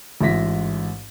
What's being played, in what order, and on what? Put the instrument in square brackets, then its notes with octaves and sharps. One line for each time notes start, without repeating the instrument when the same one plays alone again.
[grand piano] A1 G#2 F4 E5 A#6 B6